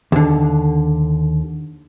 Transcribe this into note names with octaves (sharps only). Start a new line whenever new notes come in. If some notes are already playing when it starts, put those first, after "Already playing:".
D#2 D3